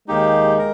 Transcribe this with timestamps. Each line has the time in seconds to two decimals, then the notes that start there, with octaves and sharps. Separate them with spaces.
0.08 D#2 D#3 G#3 A#3 D#4 G4
0.58 A#4